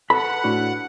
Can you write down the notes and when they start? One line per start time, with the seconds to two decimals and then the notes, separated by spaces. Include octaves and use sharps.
0.10 A4 B4 F#5 B5
0.44 A2 D4 F#4